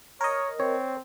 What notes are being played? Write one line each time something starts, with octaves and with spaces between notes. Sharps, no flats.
A#4 C#5 D#5
C4 C#5